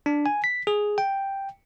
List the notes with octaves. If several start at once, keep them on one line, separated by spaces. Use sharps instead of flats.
D4
G#5
B6
G#4
G5